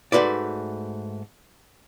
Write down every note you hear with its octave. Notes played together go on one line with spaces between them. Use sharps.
G#2 A3 F#4 B4 D5